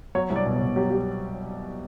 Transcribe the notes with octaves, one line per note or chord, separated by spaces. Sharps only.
F#3 C#5
C2
D5
B2
C#5
B2
F#3 G4
F#3 G4